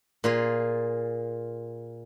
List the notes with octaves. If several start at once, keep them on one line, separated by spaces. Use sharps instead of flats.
A#2 F4 G#4